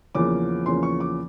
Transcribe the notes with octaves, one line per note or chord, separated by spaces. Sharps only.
E2 C#3 F3 A#3 C#4 D6
E2 C#3 F3 A#3 C#4 C6
C#6
D6